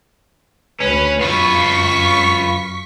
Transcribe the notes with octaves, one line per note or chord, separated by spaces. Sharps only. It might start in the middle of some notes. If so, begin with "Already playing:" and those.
D2 C#4 B4
F#2 F4 B4 C#6 B6